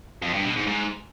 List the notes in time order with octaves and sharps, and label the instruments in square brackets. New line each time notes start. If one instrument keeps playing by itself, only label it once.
[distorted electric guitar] F2
G2
B2
G#2
G#2